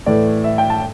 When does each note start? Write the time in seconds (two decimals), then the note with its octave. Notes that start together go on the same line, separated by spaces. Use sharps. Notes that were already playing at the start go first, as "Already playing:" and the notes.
0.06 A2 E3 A3 D5
0.44 E5
0.58 G5
0.70 A5